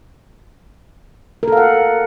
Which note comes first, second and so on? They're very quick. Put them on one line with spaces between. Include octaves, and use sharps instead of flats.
A#4 A4 F5 F#5